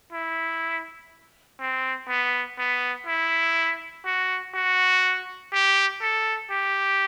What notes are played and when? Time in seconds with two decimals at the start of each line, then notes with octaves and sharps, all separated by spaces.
0.12 E4
1.60 C4
2.08 B3
2.58 B3
3.07 E4
4.05 F#4
4.55 F#4
5.52 G4
6.02 A4
6.50 G4